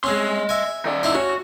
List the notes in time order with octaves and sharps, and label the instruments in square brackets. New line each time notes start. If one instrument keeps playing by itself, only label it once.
[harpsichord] G#3 C4 C#4 [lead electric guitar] D#5 C6
[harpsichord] E5 G#5
[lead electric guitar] D#3 D5
[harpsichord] D#4 E4 C5
[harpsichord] C#4 [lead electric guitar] F#4